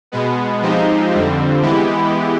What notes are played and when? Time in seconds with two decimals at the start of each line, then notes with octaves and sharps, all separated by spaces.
0.12 B2 G#3 B3
0.62 F3 G#3 C4 D#4 G4
1.12 F2 D3 G3 C4
1.62 E3 G#3 B3 E4 G4